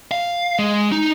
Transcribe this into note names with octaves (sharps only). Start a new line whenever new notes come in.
F5
G#3
D#4